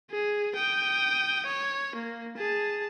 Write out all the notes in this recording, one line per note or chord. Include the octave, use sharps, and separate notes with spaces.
G#4
G5 D#6
C#5
A#3
G#4 A5